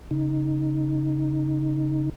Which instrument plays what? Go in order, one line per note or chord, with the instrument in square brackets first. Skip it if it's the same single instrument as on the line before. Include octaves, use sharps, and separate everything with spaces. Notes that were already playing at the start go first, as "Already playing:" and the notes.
[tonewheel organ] C#3 D#4